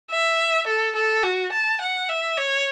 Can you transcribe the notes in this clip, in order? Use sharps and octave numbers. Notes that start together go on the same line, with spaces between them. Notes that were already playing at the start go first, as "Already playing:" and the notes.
E5
A4
A4
F#4
A5
F#5
E5
C#5